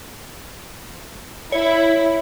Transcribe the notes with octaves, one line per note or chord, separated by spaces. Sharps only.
E4 C#5